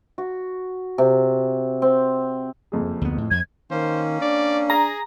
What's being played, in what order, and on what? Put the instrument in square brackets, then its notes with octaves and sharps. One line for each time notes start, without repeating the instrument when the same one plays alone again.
[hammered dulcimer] F#4
C3
C4
[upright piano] F#1 F2 G#4
[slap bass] D2 B3
A2
[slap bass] F2 [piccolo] G#6
[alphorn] D#3 [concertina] A#3 C#4 [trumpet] C5
[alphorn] D4 [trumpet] D5
[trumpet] G#4 [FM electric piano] A#5